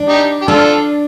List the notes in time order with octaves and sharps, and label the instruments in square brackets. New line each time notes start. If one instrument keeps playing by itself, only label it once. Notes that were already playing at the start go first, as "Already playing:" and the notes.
Already playing: [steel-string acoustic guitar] D4
[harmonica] D#4 G4
G4
[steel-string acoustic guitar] D4 [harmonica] F4 A4